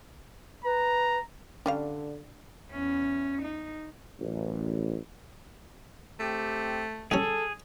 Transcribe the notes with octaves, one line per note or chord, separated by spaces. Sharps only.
B4 A#5
D3 G3 C#4 D4 F5
E2 C#4
D#4
A1 F#2
A3 C4 G4
D3 G3 C#4 G#4 A4